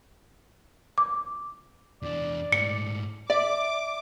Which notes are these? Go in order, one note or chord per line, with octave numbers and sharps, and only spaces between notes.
D6
E2 D4 D5
G#2 A3 C#7
D5 E5 D6